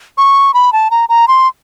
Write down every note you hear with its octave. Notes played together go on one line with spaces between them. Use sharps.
C#6
B5
A5
A#5
A#5
C6